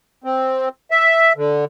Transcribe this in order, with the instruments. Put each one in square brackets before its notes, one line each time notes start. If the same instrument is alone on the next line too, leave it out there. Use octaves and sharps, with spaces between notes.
[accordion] C4
E5
D3